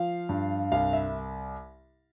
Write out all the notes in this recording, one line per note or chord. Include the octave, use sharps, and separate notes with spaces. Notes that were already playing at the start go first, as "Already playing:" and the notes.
Already playing: F3 F5
G2
C2 F5
E5